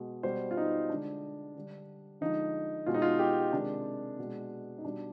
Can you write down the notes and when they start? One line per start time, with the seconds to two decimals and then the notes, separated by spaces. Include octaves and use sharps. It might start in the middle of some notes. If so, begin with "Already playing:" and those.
Already playing: B2 G#3
0.23 B2 G3 C5
0.51 F4
0.57 D#4
0.90 D3 G#3 D4
1.56 D3 G3
2.21 D3 F3 G#3 D#4
2.86 B2 G#3 F4
2.94 D#4
3.02 F4
3.19 G4
3.53 C3 D#3 G#3 D4
4.19 B2 G#3
4.78 D#4
4.85 B2 G3 D4